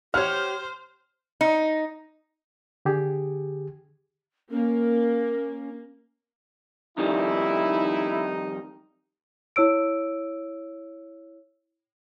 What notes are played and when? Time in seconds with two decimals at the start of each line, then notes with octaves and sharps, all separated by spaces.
0.14 G4 C5 C#5 F#5 F6
1.41 D#4
2.85 D3 G4 G#4
4.51 A#3 C#4
6.98 F2 D#3 G3 D#4 E4
9.56 E4 C#5 E6 D7